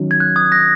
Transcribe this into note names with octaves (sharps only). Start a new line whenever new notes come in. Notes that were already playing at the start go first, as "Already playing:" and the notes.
Already playing: D#3 F#3 C#4
G#6
F#6
D#6 G#6
F#6 A#6